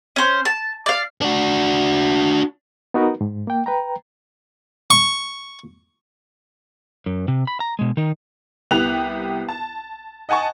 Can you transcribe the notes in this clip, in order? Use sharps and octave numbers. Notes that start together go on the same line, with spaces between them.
C#4 C5
A5
D5 F5
D4 F#4
B3 D#4 F#4 A#4 B4
G#2
A#3 G5
B4 G5 A#5
C#6
F#2
C3
B5
A#5
B2 G#3
D#3 D#4
C2 B3 E4 G4 F#6 F7
A5
D#5 F#5 G#5 A5 C#6